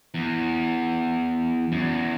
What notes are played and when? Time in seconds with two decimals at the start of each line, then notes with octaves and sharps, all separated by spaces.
0.14 E2
1.72 F#2
1.81 E2